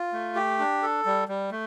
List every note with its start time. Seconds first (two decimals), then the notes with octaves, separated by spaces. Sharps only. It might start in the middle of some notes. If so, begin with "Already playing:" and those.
Already playing: F4
0.13 A3
0.35 G4
0.59 D4
0.82 A4
1.05 G3
1.28 G3
1.51 A3